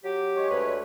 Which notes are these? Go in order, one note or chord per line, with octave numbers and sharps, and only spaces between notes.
F#3 G4
G#3 C#5
D2 B4